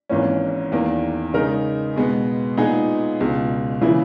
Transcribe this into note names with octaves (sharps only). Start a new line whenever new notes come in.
G#1 G#2 E3 A#3 C#4
E2 D#3 A#3
C#3 G#3 D#4 A#4
B2 G#3 B3
A#2 G#3 B3 D#4 G#4
C#2 B2 G#3
C#3 E3 A#3 E4